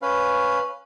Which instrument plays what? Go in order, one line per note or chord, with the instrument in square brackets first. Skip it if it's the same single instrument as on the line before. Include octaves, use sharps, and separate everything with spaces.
[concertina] C#4 B4 F5